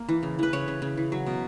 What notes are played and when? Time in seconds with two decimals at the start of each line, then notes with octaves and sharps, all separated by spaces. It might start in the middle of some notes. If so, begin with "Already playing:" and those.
Already playing: A#3
0.09 E3
0.23 C#3
0.39 E3 B4
0.53 C#3 C#5
0.68 C#3
0.82 C#3
0.97 E3
1.12 F#3
1.27 B2